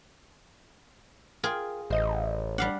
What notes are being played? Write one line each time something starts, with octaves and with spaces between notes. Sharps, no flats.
F4 G#4 A#4 G5
A1 C5 D#5
G3 D4 F5 F#5